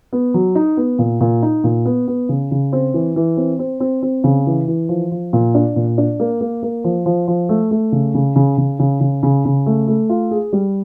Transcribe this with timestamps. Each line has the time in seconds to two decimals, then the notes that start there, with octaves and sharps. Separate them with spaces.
0.13 B3
0.34 F#3
0.55 D#4
0.77 B3
0.99 A#2
1.21 A#2
1.43 D#4
1.64 A#2
1.86 B3
2.08 B3
2.29 C#3
2.51 C#3
2.73 C4
2.94 E3
3.16 E3
3.37 C4
3.59 C4
3.80 C4
4.03 C4
4.24 C#3
4.47 E3
4.68 E3
4.89 F3
5.11 F3
5.33 A#2
5.55 D4
5.76 A#2
5.98 D4
6.20 A#3
6.41 A#3
6.63 A#3
6.84 F3
7.06 F3
7.28 F3
7.49 A3
7.71 A3
7.92 C#3
8.14 C#3
8.36 C#3
8.58 C#3
8.79 C#3
9.01 C#3
9.23 C#3
9.45 C#3
9.66 A3
9.88 A3
10.09 F4
10.31 G#4
10.53 G3